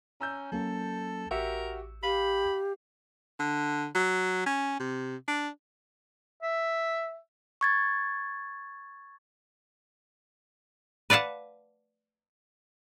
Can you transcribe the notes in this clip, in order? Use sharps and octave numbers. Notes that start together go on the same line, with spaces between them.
C#4 A#5 E6 G6
F#3 A#3 C#4 A4
A1 F#4 G4 A#4 E5 E6 C#7
G4 F5 B5
D3
F#3
C#4
C3
D4
E5
C#6 G#6 A6
B4 D5 F5 F#5 A5